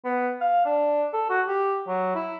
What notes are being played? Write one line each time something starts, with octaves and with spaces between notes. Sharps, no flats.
B3
F5
D4
A4
F#4
G4
F#3
E4